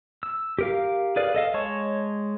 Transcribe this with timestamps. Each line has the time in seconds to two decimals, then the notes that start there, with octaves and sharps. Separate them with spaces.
0.23 E6
0.59 G4 A#4 F5
1.16 G#4 B4 D5 F5
1.35 A4 D#5 F5
1.54 G#3 C#5 A5 C#6